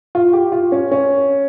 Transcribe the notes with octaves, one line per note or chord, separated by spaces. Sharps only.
F4
G4
F4
C#4
C#4